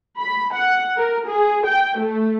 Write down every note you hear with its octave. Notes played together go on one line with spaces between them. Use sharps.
B5
F#5
A#4
G#4
G5
A3